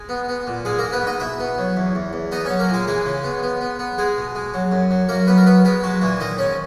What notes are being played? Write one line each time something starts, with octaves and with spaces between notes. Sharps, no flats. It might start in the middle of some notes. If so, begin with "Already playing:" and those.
Already playing: G#3 G#4
B3
B3
A#2
G#2 G#3 G#4
G#2 A#3 A#4
B3 B4
G#2 D#4 D#5
B2 E4 E5
B3
F#3
E2
E2
E2
B3 D#4 D#5
F#3 C#4 C#5
A#3 A#4
A#2 G#3 G#4
E3 G#3 G#4
C#3
B3
B3
B3
B3
G#3 G#4
B2
G#3
F#3
F#2
F#3
F#2 A#3 A#4
F#2 B3 B4
A#4
B3 B4
G#3 B3 B4
F#3 G#3 F#4
A#2 E3 E4
D#3 D#4 D#5
G#2 C#4 C#5